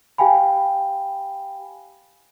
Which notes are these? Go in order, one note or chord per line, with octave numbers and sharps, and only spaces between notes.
G4 F5 G5 G#5 B5